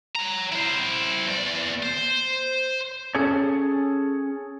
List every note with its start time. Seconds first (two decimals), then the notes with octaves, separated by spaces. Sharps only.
0.16 C#5 A#5
0.52 E4 C5
1.27 E2 D5
1.83 C5
3.15 C#4 G#4 A4 C#5